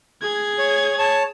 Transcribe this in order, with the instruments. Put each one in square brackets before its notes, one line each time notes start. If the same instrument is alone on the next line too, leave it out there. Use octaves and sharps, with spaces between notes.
[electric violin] G#4 G#6
[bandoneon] C#5
C#5 A5